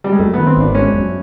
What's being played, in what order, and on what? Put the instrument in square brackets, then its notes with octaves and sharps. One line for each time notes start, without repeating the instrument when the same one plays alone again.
[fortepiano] G3
G#3
[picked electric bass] F#2 [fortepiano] A3
[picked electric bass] D#3 [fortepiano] B3
[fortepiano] C4
[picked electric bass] G#1 [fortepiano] D4
[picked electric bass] G#3 [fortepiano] C#4
[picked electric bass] F#2